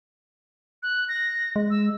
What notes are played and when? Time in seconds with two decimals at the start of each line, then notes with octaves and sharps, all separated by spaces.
0.83 F#6
1.09 A#6
1.56 G#3
1.70 E6